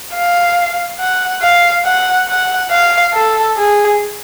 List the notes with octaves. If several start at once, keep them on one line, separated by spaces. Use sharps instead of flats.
F5
F#5
F5
F#5
F#5
F5
A4
G#4